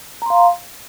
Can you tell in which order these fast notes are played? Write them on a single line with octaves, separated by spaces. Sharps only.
A#5 C6 F5